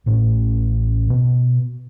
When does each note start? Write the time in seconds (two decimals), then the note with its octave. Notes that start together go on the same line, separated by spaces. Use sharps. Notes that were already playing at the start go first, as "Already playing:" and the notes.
0.06 A1 A2 C#4
1.10 B2